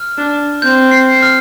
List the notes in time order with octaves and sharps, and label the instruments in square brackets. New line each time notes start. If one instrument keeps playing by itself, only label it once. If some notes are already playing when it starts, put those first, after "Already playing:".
Already playing: [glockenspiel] F6
[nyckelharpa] D4
[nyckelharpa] C4 [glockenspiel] G6
[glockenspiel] C7
F6